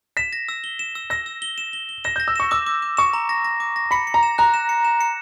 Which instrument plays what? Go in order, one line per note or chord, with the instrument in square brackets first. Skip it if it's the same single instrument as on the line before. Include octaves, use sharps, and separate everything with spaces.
[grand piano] B6 [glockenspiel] E7
[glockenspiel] A#6
E6
G7
E7
E6
[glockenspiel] E6 [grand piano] A#6
[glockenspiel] E6
G7
E7
G7
G7
[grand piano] A#6 [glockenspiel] E7
[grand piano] G6 [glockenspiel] A#6
[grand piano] E6
[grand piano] C#6 [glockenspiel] E7
[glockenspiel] D6 [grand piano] E6
[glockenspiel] D6
D6
[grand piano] C#6 [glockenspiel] E7
[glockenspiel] A#5
A#6
A#6
D6
A#6
[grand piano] B5 [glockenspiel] C#7
[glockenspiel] C#7
[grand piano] A#5
[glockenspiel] E7
[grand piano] A#5 [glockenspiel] F#6
[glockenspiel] E7
C#7
E7
C#7